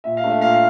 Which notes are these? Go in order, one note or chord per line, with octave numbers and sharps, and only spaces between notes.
A#2 E5
F5
A3 D4
E5
A#2 F5
F5